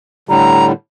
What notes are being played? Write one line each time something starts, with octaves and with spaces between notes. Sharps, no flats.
A2 D3 G3 A#5